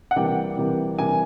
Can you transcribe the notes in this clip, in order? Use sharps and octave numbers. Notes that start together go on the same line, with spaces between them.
F#5
C3 E3 G3 A#3 G5
C3 E3 G3 A#3
C3 E3 G3 A#3 G#5